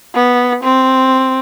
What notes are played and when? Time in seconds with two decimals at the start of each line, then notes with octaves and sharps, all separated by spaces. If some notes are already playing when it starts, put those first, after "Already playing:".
0.15 B3
0.63 C4